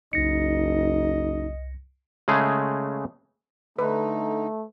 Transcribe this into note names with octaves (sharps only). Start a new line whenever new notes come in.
F#1 C2 D#4 D#5 A#6 C#7
C#3 G#3 A3 G#4
D3 A3 D#4 B4